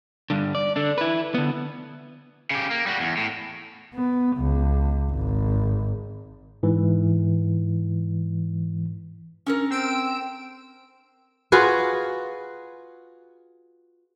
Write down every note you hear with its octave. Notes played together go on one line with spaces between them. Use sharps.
G2 D3
D5
D3 D4
E4 B4
D3 B3
C#3 G4
A#3
G3 F#4
E2
A2
B3
C#2
G#1
G#2 E3
C#4 A4 A#4
C4 E6 D7
F4 F#4 G#4 B4